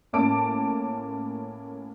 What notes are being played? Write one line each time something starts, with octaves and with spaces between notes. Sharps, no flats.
A2 A#3 C#4 A5 D6 D7